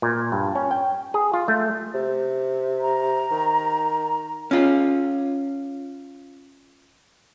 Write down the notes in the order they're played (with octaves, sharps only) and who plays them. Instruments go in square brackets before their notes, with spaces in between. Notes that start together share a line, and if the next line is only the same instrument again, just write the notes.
[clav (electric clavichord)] A#2
G2
C#4
G5
G#4
F4
A3
[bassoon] C3
[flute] A#5
[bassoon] D#3
[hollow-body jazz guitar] C#4 F4